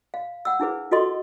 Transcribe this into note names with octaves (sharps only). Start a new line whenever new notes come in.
F5
F#5 E6
D4 E4 G#4 B4
F4 F#4 A4 D#5 C6 C#6